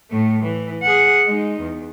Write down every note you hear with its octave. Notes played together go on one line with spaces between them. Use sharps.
A2 A3
E3
G#4 F#5
G#3 D#4
E2